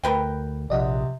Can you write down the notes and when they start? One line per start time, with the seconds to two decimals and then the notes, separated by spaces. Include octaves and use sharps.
0.03 D2 A#4 B4 G5
0.70 A#1 C3 D5 D#5 F#5